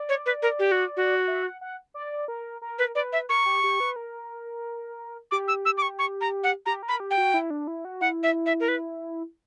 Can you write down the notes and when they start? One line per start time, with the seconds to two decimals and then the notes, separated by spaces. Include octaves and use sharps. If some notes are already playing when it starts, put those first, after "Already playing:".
Already playing: D5
0.09 C#5
0.26 B4
0.42 A#4
0.59 G4
0.72 F#4
0.97 F#4
1.28 E5
1.43 F#5
1.61 F#5
1.94 D5
2.28 A#4
2.62 A#4
2.79 B4
2.95 B4 D5
3.13 E5
3.29 A#4 C#6
3.46 G4
3.64 G4
3.80 B4
3.96 A#4
5.31 G4 D6
5.48 E6
5.65 E6
5.78 D6
5.82 C#6
5.99 C#6
6.21 A#5
6.44 F#5
6.66 G4 A#5
6.83 A#4
6.88 B5
7.00 G4
7.11 G5
7.17 F#4
7.34 E4
7.50 D4
7.67 E4
7.85 F#4
8.01 E4 F#5
8.23 E5
8.46 E5
8.60 A#4
8.68 B4